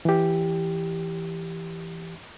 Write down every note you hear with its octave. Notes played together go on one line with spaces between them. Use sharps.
E3 G4